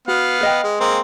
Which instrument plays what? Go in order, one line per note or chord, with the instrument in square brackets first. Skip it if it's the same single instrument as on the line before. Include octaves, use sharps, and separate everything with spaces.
[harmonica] B3 F5 [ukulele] F#4
[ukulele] B4 D#5 G5
[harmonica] G#3
G#3 A#3 C4